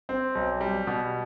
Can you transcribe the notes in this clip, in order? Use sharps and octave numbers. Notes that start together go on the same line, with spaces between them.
C4
B1
G3
B2